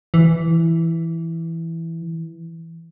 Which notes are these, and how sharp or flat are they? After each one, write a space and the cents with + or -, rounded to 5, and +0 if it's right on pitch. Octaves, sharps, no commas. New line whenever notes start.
E3 +0